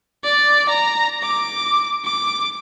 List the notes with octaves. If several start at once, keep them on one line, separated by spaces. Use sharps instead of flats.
D5
A#5
D6
D6